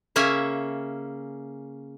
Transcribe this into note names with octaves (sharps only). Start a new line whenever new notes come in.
C#3 A#3 C#4 E5 G#5